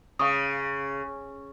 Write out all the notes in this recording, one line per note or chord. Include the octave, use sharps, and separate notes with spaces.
C#3 F5 C#6 D#6